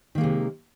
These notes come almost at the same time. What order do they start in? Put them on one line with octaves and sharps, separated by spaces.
D#3 A#3 G#3 C3